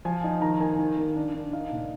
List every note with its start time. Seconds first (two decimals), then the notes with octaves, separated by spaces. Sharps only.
0.05 F3 G#5
0.24 D#4
0.42 D#3 A#5
0.60 A#3 G#5
0.79 D#3
0.97 A#3
1.16 D4
1.34 D4
1.53 D#4 F5
1.71 A#2